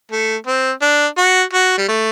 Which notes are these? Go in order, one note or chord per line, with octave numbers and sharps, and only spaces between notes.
A3
C4
D4
F#4
F#4
G3
A3